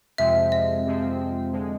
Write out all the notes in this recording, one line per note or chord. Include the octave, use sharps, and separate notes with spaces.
F2 C3 F3 G#3 C4 E5
D#5
F2 C3 F3 G#3 C4
D3 F3 G#3